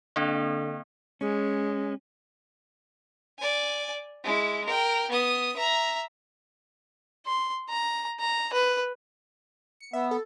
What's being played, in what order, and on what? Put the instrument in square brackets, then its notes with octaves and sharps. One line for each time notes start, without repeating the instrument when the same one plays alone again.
[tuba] D3 [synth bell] A#3 C4 D4
[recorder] G#3 [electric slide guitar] C#4
[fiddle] D5 G#5
G#3 E4
A#4 G5
B3 D#6
E5 A#5
C6
A#5
A#5
B4
[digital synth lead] C#7
[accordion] B3 [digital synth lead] E5
[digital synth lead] A4